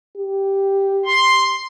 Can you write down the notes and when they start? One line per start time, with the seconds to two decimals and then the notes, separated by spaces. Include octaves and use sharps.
0.17 G4
1.05 C6